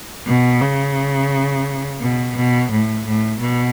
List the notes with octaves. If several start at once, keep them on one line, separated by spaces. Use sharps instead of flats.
B2
C#3
B2
B2
A2
A2
B2